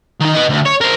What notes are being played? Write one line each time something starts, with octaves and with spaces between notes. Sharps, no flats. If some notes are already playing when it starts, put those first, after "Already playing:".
D#3 D#4
B4 D#5
D2
C#5
A#4 C5